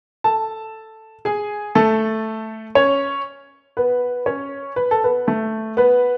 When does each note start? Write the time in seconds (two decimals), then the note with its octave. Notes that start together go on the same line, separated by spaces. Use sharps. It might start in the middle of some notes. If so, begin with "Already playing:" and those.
0.24 A4 A5
1.25 G#4 G#5
1.75 A3 A4
2.75 C#4 C#5
3.77 B3 B4
4.26 C#4 C#5
4.76 B4
4.91 A4
5.04 B3 B4
5.27 A3 A4
5.77 B3 B4